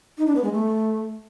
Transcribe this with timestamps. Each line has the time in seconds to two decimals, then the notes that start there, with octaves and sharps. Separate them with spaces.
0.18 D#4
0.27 D4
0.35 B3
0.44 G#3
0.52 A3